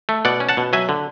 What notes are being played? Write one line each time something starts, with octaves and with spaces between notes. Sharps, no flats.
A3
B2 D5 F#5
C#4
F#5 A5
B2
F#3 E5 G#5
D3